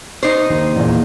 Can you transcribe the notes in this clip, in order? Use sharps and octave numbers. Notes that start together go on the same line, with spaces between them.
D#4 C5
D#2
E2 A#2